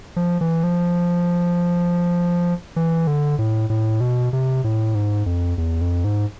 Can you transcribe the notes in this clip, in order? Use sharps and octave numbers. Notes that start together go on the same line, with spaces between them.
F3
E3
F3
E3
D3
A2
A2
B2
C3
A2
G#2
F2
E2
F2
G#2